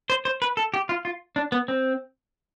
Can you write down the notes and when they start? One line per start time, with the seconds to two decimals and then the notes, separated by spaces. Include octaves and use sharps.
0.10 C5
0.25 C5
0.42 B4
0.57 A4
0.74 G4
0.89 F4
1.05 F4
1.36 D4
1.52 B3
1.68 C4